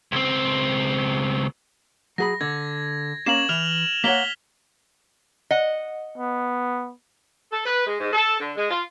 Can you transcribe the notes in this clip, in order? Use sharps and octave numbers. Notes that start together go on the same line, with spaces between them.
C#2 C4
F#3 G#4 B5 A#6
D3 G#6
A#3 C#4 F5 E7 F#7
E3 F6 F7
A#3 C#5 F#5 B6 F#7 G7
D#5 F#5
B3
A4
B4
G#3
G#2
A4
D3
G#3
F4